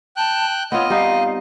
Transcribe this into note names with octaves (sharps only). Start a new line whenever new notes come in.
G5 A5 F#6
B3 C4 F4 C#5 D#5
G3 D#4 F5